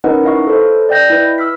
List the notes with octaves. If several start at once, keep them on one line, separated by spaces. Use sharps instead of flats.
C#4 D#4 A#4 B4 D#5 F#5
E4 D#5 F5 C#6
A4 B4 C5 D#5
D5 D#5 G5 G6 A#6
E4 B4
E6 F6 B6